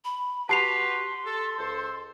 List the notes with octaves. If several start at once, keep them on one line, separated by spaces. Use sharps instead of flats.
B5
F#4 G4 B4 A5 C6 C7 F7
A4
C#2 A4 C5